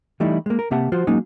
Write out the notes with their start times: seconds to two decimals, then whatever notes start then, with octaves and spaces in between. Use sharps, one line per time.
0.20 E3 G3 A3 D#4 E4
0.46 G#3 A#3
0.59 A#4
0.71 C3 A#3 G4 E5 F#5 A5
0.92 F3 F4 F#4 C5
1.07 F#3 G#3 A#3 C#4 D#4